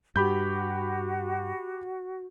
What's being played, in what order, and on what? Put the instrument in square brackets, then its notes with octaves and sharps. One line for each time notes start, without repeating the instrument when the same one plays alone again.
[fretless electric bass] G2 [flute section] F#4 [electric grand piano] G4 B5 G6